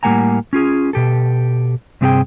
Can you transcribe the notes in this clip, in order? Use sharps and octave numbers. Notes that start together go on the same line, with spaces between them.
A2 G3 A#3 F#5 G#5 A#5
C#4 F4 G#4
B2 G4 A4
G2 C3 C4 G4 G#4 G5